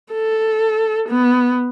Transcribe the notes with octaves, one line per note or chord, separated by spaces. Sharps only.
A4
B3